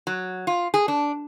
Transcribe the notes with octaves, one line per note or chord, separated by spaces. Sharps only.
F#3
F4
G#4
D4